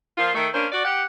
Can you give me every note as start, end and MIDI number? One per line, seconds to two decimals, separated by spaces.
0.18 0.30 46
0.18 0.30 53
0.18 0.30 65
0.35 0.47 51
0.35 0.47 57
0.53 0.66 58
0.53 0.66 61
0.53 0.66 62
0.53 0.66 72
0.72 0.85 66
0.72 0.85 74
0.85 1.03 67
0.85 1.03 78